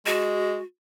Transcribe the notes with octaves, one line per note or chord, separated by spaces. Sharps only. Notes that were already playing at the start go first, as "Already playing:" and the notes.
G#3 F#4